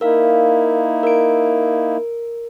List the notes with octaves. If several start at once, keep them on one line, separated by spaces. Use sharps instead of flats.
A#3 D#4 E4 A#4 F5
A#4 D7